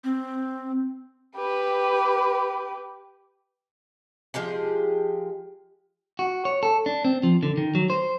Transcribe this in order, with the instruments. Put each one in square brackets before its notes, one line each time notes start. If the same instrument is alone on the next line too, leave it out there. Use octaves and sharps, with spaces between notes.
[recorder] C4
[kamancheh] G4 B4
[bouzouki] F3 G#3 G4 G#4
[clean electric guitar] F#4
C#5
A4
D4
C4
F3
D3
D#3
F#3
C5